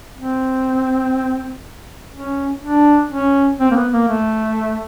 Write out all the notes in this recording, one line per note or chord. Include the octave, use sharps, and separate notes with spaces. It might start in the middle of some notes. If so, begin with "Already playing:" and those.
C4
C#4
D4
C#4
C4
A#3
B3
A#3
A3